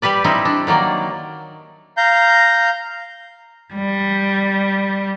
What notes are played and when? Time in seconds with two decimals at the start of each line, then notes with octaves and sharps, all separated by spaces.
0.02 G3 G4 B4 D5
0.24 G3 C4 D#4 E4
0.45 D4
0.67 D#3 F#3 A#3 D5
1.97 F5 A#5 G6
3.74 G3